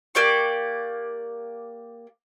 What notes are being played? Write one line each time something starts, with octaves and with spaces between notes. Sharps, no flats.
A#3 G4 D5 C#6